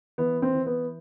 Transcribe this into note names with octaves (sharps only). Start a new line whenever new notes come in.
E3 B3
C4
E3
B3